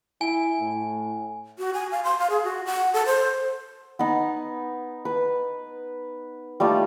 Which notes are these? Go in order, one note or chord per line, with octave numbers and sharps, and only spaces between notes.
E4 G#5
A2
F#4
G#5
F5
C6
F5
G#4
F#4
F#5
A4
C5
B3 D#4
B4
G3 A3 D#4 F4